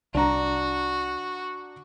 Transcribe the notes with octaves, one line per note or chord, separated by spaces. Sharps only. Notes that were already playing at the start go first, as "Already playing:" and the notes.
C2 D4 F#4 A#5